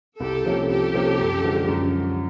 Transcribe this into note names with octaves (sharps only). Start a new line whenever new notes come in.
C2 G4 A4
C3 F3 A#3 C#4
C2 G4 A4
C3 F3 A#3 C#4
F#2
D3 F3 G#3
F#2